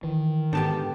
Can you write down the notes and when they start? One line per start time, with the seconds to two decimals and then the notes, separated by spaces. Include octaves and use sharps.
0.03 D#3 E3
0.53 G#2 D3 B3 G4 G5 A5